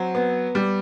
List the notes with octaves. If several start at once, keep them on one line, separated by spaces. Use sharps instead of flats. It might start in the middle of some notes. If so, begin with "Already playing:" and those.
Already playing: F#3 C4
B3
G3